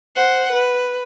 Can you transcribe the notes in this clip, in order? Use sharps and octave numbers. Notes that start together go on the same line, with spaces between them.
C5 F#5
B4